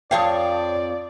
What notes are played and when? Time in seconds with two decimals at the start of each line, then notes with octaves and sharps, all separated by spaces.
0.11 F2 C#5 D5 F5 G5 A5 D#6